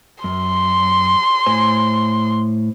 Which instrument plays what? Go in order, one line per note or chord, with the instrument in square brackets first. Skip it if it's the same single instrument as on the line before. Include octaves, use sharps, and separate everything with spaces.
[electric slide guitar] F#2 [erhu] C6
[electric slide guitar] A2 C5 G#5